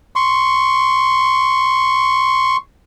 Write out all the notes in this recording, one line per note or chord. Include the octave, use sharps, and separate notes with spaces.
C6 C#6